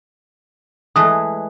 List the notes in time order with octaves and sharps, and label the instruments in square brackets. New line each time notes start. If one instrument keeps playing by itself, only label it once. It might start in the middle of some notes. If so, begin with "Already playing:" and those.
[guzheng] E3 G#3 A3 [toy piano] D#6